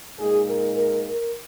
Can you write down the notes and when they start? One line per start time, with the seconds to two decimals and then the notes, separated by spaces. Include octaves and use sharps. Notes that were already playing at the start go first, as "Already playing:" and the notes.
0.17 A#2 G#3 D#4 G#4
0.48 A#4
0.77 A#4
1.07 A#4